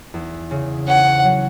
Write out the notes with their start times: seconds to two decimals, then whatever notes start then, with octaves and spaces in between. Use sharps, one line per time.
0.14 E2
0.51 C#3
0.87 C#4 F#5
1.24 F#3